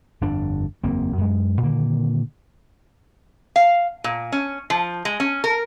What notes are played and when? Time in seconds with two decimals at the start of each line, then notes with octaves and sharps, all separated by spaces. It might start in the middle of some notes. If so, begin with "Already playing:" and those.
0.21 G1 F2 D4
0.84 F#1 E2 A#3 C4
1.18 F#2 G#3
1.63 A#2 D3 D#3 A#3
3.56 F5
4.04 A#2
4.32 C#4
4.70 F3
5.05 G#3
5.20 C#4
5.44 A#4